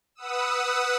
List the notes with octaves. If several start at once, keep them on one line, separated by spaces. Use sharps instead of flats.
B4 F#5 D#6 E6